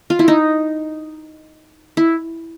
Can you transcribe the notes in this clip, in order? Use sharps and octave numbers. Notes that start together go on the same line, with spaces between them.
F4
E4
D#4
E4